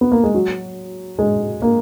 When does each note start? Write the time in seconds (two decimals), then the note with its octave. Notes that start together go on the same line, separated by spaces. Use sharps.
0.01 B3
0.12 A#3
0.24 G#3
0.34 F#3
1.19 G#3
1.62 A#3